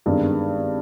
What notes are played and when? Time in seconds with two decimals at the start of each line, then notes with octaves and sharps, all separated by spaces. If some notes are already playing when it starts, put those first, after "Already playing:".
0.06 G#1 G2 D#3 G#3 B3